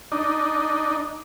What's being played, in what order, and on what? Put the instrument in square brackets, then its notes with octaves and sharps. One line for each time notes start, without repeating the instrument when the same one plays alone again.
[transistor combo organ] D4 D#4